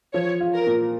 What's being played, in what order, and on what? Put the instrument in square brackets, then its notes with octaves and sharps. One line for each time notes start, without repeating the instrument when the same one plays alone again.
[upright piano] F3 [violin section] C#5
[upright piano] F4
[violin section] A#4
[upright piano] A#2